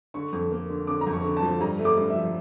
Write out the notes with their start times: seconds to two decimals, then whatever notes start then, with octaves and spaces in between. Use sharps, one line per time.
0.14 D3 C#6
0.33 F2
0.52 A#3
0.69 D3
0.87 D3 D6
1.01 A#5
1.07 F2
1.13 C#6
1.24 D3
1.37 A5
1.42 F3
1.60 G2 A#5
1.79 A3
1.85 D6
1.97 G2
2.10 E5
2.15 F3